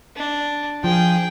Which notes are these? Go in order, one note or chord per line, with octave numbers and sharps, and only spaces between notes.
D4
F3 G#4 G5